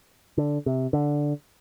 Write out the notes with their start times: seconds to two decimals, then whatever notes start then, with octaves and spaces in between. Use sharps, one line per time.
0.38 D3
0.66 C3
0.93 D3